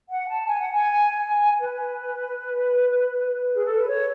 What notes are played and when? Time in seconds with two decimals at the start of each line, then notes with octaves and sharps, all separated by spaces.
0.09 F#5
0.28 A5
0.46 G#5
0.59 F#5
0.73 G#5
1.60 B4
3.53 G#4
3.64 A4
3.75 B4
3.87 C#5